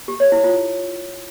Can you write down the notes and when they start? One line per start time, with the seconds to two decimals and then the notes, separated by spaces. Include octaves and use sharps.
0.08 G4
0.20 C#5
0.32 E4
0.44 F4